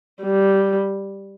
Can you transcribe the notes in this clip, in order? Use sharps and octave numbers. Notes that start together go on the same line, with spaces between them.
G3